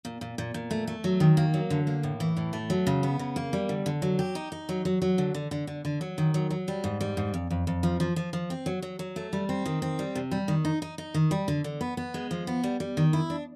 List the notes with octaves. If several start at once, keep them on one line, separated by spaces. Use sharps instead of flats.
A#2
A#2
A#2
A#2
A3
A3
F#3
D#3
A#3
F#3
D3
A#3
A2
E3
A2
A3
F#3
C#3
B3
C#3
A#3
G3
D3
D3
F#3
G4
D#4
D#4
F#3
F#3
F#3
D3
D3
D3
D3
D3
F#3
D#3
F#3
F#3
G3
G#2
G3
G#2
F2
F2
F2
F3
F3
F3
F3
C4
F#3
F#3
F#3
A3
G3
C4
D#3
C4
G3
C3
G3
D#3
D#4
D#4
D#4
D#3
G3
D3
D3
B3
B3
G#3
F3
B3
G3
G3
D#3
E4
D4